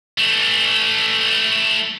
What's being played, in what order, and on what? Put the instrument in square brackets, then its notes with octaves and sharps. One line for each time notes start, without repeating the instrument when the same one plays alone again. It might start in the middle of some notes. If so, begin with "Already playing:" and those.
[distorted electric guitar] E3 A3